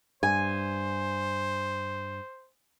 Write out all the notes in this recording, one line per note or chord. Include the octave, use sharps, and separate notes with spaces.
G2 C5 G#5